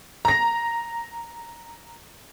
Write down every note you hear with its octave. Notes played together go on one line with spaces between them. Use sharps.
A#5 A#6